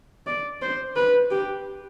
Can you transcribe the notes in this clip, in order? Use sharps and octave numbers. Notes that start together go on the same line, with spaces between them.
D5
C5
B4
G4